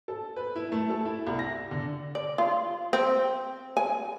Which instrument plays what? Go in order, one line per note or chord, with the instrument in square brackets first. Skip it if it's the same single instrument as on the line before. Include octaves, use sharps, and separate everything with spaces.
[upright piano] A4
B4
E4
A3
A4
E4
C2
A#6
D3
[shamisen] D5
F4
C4
G#5